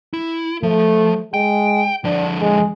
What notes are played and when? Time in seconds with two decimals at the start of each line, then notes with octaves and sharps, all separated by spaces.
0.14 E4
0.63 F3 A3
1.34 G#3 G5
2.05 D3 F3 D4
2.41 G#3